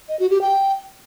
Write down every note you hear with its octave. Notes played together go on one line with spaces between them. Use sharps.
D#5
F#4
G4
G5